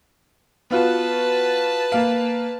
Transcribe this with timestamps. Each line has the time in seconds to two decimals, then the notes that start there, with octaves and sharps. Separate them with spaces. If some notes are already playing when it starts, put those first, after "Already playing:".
0.71 B3 F4 F#4 B4 A5
1.92 A#3 F5